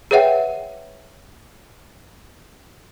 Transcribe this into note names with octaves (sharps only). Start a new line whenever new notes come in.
G#4 B4 C#5 E5 F#5 G5